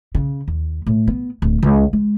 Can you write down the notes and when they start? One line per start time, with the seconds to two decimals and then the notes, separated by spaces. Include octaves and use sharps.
0.15 C#3
0.48 D#2
0.86 A2
1.08 B3
1.42 D1
1.63 C#2
1.93 G#3